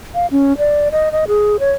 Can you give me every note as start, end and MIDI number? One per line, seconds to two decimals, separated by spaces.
0.15 0.27 77
0.31 0.57 61
0.58 0.89 74
0.92 1.12 75
1.12 1.25 75
1.28 1.57 68
1.60 1.72 73